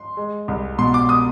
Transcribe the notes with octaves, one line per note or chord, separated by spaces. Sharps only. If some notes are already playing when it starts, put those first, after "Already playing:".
Already playing: C6
G#3
C2
B2 C6
D6
D#6